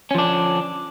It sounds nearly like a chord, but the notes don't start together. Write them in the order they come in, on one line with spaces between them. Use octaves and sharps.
C#4 F3 D4 D3